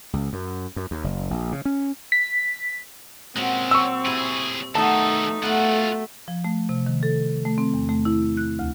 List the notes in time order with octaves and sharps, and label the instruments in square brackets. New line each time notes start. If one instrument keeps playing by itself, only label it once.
[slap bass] C#2
F#2
F#2
D#2
F#1
A#1
C#3
C#4
[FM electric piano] B6
[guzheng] A#2 F#4 A5 [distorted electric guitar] G#3 C#4 [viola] C4
[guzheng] F#3 [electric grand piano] C#6 E6
[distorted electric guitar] A2 G#4 [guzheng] G3 E4
[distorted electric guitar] D#3 A4 [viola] A3 D#4 [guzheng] B3 F#4 [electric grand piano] A5
[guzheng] F#3 B3 [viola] A3 [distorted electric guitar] F4 F#5
[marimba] F3
A3
C3
D#3
A4
A3
C4
E2
A3
E4
F#6
D2